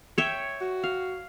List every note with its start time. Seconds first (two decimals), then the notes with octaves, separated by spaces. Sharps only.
0.18 C#5 E5 G5
0.61 F#4
0.84 F5